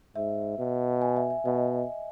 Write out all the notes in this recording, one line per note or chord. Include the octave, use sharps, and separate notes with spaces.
G#2 E5
B2
G#5
E5
E5
B2 D#5